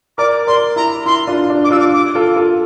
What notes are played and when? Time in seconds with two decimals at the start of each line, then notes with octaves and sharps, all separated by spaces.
0.18 A#4 D5 D6
0.47 A#4 D5 C6
0.76 E4 A#5
1.06 E4 C6
1.27 D4 F4
1.50 D4
1.64 D6
1.71 D4 F4 E6
1.80 D6
1.93 D6
2.15 F4 A4
2.36 F4 A4